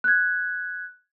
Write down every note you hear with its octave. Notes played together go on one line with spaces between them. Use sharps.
F#6 G#6